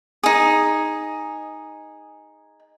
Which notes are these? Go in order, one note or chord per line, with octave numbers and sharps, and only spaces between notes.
D#4 G#4